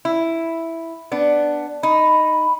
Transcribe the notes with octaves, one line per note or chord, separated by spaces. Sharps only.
E4
B3 D4
D#4 B5